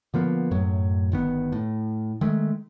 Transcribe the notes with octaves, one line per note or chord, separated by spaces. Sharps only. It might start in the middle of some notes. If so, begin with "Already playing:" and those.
D3 F3 A#3 B3
F#2 A2 F#3
G1 D#3 B3
A2
D#3 G#3 A3